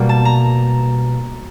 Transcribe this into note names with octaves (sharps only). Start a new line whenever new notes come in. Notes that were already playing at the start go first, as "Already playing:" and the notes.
Already playing: B2 G3 A#3
A5
A#5